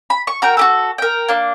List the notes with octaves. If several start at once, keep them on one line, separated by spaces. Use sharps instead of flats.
B5
C#6
F#4 A#4 G5
F#4 G4 A4
A#4 G5
A#3 D4